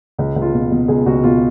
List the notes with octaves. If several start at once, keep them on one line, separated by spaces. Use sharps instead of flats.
C#2
C#2
F4
B2
B2
C#2 G#4
C#2 F#4
B2 F4